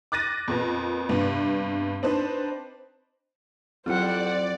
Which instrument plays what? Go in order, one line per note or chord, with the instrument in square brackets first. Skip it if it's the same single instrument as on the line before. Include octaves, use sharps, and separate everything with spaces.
[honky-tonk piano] D6 F#6 A6 A#6 D#7
F2 A#2 B3
G2 C3 B3
C4 D4 D#4 B4 C5
[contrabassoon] F2 [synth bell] F#3 E4 [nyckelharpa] C5 F#5 [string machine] D5